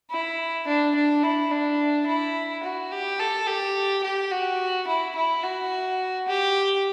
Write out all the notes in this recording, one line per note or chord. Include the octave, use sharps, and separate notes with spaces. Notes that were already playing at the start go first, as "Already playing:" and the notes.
E4
D4
D4
E4
D4
E4
F#4
G4
A4
G4
G4
F#4
E4
E4
F#4
G4